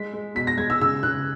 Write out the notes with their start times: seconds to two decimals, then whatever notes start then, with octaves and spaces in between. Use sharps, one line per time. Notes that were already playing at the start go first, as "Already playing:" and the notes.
Already playing: G#3 B6
0.13 G#3
0.35 B2 B6
0.47 A#6
0.58 G#3 G#6
0.70 E6
0.81 C#3 E6
1.03 C#3 F#6